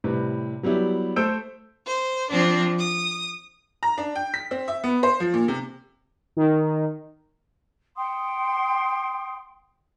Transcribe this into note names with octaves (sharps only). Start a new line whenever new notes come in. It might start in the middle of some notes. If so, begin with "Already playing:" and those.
A2 C3 G3 B4
F#3 G3 B3 E4 G4
A3 A4 C5 E6 G6 D7
C5
F3 C4 D4
D#6
A#5
D4
G5
B6
C4
E5
B3
C5
F3
A#2
C3
D#3
F#5 G5 C6 D#6